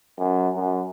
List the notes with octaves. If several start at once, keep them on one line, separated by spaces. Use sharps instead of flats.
F#2
F#2